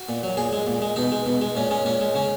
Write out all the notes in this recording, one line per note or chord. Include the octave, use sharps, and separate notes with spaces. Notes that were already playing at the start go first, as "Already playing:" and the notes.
Already playing: F#4
A#2
F#3
A#2 G#4
G#3
A#2
G#3
B2 D#4
G#3
B2
G#3
A#2 C#4
G#3 C#4
A#2 C#4
G#3
C#3 C#4